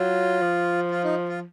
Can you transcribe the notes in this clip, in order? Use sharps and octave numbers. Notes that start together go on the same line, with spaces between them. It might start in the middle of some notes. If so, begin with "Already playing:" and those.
Already playing: F#3 F4
F3
F4
D#4
F4